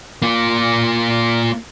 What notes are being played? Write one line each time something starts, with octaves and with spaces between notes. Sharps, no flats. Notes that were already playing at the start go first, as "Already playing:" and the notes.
A#3 F4